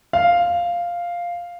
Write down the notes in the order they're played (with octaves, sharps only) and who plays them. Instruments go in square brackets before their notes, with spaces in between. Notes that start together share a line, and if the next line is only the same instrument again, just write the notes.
[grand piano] F5